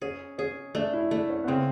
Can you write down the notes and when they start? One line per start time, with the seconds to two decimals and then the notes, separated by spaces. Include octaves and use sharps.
0.02 C#4 G#4
0.38 C#4 G#4
0.75 A3 D4
0.94 E4
1.11 A3 D4
1.30 C#4
1.44 B3
1.48 C#3 C4